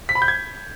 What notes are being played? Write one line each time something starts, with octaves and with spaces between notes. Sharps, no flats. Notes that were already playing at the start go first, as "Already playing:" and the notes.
B6
B5
G6
G#6